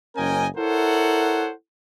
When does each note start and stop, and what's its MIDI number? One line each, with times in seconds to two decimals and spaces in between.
0.16 0.46 30
0.16 0.46 61
0.16 0.46 70
0.16 0.46 75
0.16 0.46 79
0.16 0.46 80
0.57 1.51 64
0.57 1.51 69
0.57 1.51 70
0.57 1.51 72
0.57 1.51 73
0.57 1.51 78